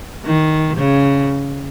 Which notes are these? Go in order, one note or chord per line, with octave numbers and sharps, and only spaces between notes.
D#3
C#3